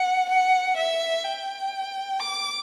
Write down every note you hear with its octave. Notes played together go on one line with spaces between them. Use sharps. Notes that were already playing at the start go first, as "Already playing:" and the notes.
Already playing: F#5
F#5
E5
G5
D6